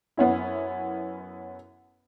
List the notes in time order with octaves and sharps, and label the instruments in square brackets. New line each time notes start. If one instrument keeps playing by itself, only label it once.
[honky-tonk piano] F#2 B3 C#4 E4